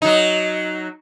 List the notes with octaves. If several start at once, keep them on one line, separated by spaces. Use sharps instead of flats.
F#3 D#4